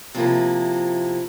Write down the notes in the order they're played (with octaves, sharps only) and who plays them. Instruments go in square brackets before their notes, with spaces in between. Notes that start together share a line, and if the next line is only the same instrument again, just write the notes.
[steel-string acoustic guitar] C3 F3 A#3 E4